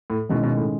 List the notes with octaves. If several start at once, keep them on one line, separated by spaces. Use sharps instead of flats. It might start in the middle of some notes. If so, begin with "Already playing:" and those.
A2
B2 D#3 G#3 C#4 E4
B2
A2